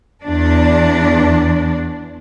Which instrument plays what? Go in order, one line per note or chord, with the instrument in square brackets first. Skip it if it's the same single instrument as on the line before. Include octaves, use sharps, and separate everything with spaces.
[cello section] E2 D4